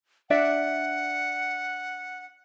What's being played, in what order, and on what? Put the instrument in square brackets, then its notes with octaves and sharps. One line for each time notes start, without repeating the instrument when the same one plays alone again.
[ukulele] D4 D5 E5 [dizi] F#5